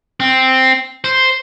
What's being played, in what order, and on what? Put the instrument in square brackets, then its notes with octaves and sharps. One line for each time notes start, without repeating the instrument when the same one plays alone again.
[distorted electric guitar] C4
C5